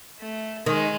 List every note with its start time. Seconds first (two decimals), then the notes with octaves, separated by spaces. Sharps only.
0.20 A3
0.66 D#3 G#3